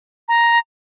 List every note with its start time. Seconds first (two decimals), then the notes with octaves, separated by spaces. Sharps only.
0.28 A#5